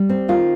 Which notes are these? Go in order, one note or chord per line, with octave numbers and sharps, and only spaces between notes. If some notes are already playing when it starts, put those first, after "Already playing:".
Already playing: G3
C4
D#3 F4